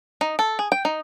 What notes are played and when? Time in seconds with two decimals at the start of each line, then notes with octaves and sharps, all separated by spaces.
0.21 D#4
0.39 A4
0.59 G#4
0.72 G5
0.85 D#4